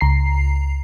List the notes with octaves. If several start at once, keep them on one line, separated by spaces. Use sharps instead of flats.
C#2 A#5 C7